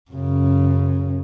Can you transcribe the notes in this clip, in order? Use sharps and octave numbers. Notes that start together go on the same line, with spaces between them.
F#2 C#3